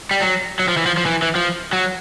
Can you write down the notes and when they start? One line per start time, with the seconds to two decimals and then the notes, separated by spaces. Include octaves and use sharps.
0.11 G3
0.21 F#3
0.59 F#3
0.68 F3
0.77 E3
0.86 F3
0.97 F3
1.06 E3
1.22 E3
1.35 F3
1.73 F#3